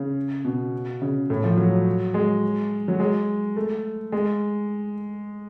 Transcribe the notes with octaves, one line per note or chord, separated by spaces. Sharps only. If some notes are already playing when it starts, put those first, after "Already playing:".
Already playing: C#3
B2
C#3
A2
F3
F#3
G#3
F#3
G#3
A3
G#3